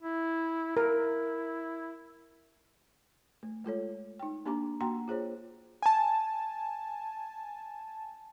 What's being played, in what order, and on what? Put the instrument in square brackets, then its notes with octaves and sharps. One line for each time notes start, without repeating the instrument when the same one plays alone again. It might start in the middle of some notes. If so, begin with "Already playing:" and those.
[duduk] E4
[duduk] E4 [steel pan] A#4
[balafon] A3
G#3 F4 A4 C#5
D#4 G5
A#3 D4 G4 G#5 A#5 D6
A#3 F#4 F#5 G5 A#5 C6
F4 G#4 C5 C#5
[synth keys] G#5 A5